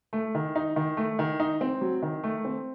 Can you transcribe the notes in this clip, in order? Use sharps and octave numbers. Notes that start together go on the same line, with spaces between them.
A3
D#3
D#4
D#3
A3
D#3
D#4
C4
F#3
D#3
A3
C4